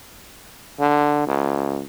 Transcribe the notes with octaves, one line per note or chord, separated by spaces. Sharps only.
D3
C#2